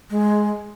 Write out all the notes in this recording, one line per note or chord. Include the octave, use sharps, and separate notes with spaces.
G#3